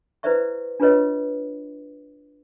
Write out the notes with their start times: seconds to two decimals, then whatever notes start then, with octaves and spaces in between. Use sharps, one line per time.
0.23 E4 B4 C5 D5 E5 C#6
0.80 D4 F4 G#4 B4 C#5 D#5